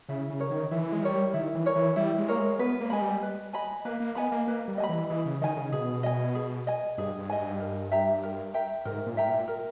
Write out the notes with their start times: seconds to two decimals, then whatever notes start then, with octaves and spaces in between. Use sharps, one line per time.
0.09 C#3 E4
0.30 C#3
0.39 A#4 C#5
0.50 D#3
0.71 E3 E4
0.92 G#3
1.02 G3 A#4 C#5
1.34 D#3 E4
1.55 E3
1.66 A#4 C#5
1.76 E3
1.96 G3 E4
2.18 G#3
2.28 A#3 A#4 C#5
2.38 G#3
2.59 B3 B4
2.80 A#3
2.90 G#3 D#5 G#5 B5
3.01 G3
3.22 B4
3.53 D#5 G#5 B5
3.85 A#3 B4
4.00 A#3
4.15 B3 D#5 G#5 B5
4.32 A#3
4.47 A#3 B4
4.68 G3
4.78 D#5 G#5
4.83 B5
4.89 E3
5.10 E3 G#4
5.26 C#3
5.42 D#3 D#5 G#5
5.57 C#3
5.72 B2 G#4
6.03 D#5 G#5
6.35 G#4
6.67 D#5 G#5
6.98 G2 G#4
7.19 G2
7.29 G#2 D#5 G#5
7.39 G2
7.60 A#4
7.91 E5 G5 A#5
8.23 A#4
8.54 E5 G5 A#5
8.85 G#2 A#4
9.06 A#2
9.17 G#2 E5 G5 A#5
9.27 A#2
9.48 A#4